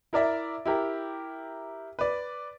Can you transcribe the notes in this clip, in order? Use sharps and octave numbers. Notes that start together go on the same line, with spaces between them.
E4 A#4 D5 E5 A#5
E4 G4 A#4
B4 D5